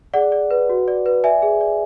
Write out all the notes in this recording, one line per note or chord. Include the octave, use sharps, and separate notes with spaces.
G#4 D5 F#5
D5
B4
F#4
D5
B4
D5 E5 G#5
G#4
D5